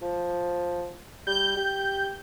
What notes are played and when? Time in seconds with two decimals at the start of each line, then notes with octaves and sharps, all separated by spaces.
0.02 F3
1.27 G3 G6
1.57 G4